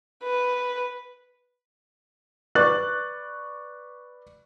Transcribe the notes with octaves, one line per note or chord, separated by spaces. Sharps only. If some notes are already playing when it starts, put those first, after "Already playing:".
B4
B4 D5 C#6 D6 F#6 A6